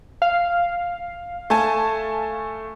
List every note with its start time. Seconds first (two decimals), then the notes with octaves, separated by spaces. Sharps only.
0.22 F5
1.50 A3 G#5 A5